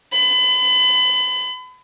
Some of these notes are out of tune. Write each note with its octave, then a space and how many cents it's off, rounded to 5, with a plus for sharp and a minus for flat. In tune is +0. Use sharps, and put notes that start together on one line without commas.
B5 +35